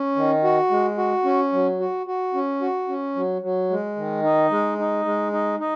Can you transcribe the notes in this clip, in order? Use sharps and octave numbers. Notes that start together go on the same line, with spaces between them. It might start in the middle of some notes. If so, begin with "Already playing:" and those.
Already playing: C#4
D#3
F#4
G#3
F#4
C#4
F#3
F#4
F#4
C#4
F#4
C#4
F#3
F#3
G#3
D#3
D#4
G#3
D#4
G#3
D#4
D#4